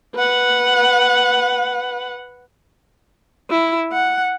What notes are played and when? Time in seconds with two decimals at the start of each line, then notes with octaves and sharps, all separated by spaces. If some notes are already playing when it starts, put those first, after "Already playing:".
0.16 B4 F#5
3.50 E4
3.92 F#5